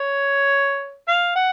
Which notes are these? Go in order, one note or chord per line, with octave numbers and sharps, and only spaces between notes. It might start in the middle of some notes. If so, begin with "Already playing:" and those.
Already playing: C#5
F5
F#5